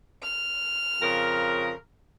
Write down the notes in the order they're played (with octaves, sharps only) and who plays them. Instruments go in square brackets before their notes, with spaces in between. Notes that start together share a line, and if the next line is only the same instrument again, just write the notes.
[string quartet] F6
[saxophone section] F2 C#3 A#4